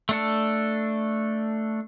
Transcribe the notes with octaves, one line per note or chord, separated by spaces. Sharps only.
A3 D4 A4